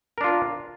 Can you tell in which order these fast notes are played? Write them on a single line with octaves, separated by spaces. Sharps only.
A#4 D4 F4